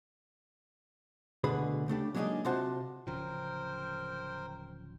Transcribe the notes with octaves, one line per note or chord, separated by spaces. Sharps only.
D2 B2 D3 G#4 B4 B5
C#3 A3 D4 G4
F#3 G#3 A#3 D4 D#4 G#4
C3 F4 F#4 C5 A5
D1 C#3 F3 A#4 C5 G5